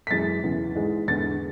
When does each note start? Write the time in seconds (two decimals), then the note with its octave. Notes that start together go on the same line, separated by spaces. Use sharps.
0.07 B6
0.11 F#2 E3 G#3 A6
0.43 E2 C#3 E3
0.75 G#2 E3 G#3
1.08 E2 D3 G#3 A6